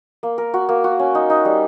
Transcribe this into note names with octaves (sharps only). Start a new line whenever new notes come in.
A#3
A#4
F#4
A#3
F#4
C#4
D#4
D#4
G3